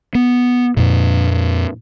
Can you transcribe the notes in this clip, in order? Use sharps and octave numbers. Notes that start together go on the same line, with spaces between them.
B3
F2 A#2